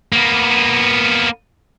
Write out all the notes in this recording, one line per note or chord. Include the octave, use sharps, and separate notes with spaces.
A#3 B3